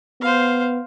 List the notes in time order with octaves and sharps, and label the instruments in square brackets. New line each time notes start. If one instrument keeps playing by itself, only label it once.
[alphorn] B3 [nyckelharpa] C5 F5